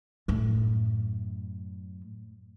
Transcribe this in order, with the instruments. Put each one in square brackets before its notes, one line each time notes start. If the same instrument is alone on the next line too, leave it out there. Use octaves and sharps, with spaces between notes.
[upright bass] F#2 A2